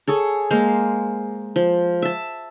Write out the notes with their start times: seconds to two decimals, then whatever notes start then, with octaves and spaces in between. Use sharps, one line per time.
0.08 G#4 A4 C#5
0.50 G#3 A#3 C5 F5
1.56 F3
2.02 E5 A5